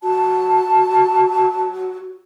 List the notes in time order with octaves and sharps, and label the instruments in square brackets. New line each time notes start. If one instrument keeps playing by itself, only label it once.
[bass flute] F#4 [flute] A5